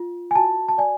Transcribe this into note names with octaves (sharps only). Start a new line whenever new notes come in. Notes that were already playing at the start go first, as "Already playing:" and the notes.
Already playing: F4
G#5
F#4 A5
A5
D5 G#5